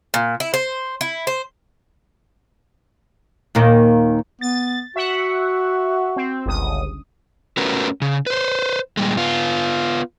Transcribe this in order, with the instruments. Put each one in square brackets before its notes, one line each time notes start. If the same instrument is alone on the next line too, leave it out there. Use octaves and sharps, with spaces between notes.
[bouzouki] A#2
E4
C5
E4
C5
[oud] D#2 A#2 D#3
[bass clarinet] B3 [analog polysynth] A6
[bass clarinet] F#4 [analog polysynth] E5 F#5
[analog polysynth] C4
G1 C#2 D#6
[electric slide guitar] A3 C#4 F#4 A#4 B4
C#3
B4 C5
A#2 G3 G#3
B3 F4